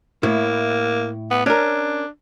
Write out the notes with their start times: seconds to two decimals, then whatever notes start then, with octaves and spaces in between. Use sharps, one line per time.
0.23 A2 A#3 E4
1.31 B3
1.46 C#4 D4 A#4